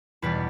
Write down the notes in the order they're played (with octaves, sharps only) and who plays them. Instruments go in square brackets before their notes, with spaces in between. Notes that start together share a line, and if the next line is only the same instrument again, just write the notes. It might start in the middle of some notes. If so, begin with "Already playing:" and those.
[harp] E2 B2 G3 B4